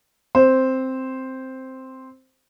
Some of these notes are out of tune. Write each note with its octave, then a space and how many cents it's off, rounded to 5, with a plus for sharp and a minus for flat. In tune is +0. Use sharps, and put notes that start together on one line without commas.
C4 +0 C5 +0